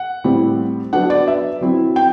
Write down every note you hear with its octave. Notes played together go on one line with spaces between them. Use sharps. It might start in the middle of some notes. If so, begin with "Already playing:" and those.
Already playing: F#5
A2 G3 C4 E4
F#3 B3 D4 F#5
D5
E5
F#3 C4 E4
G5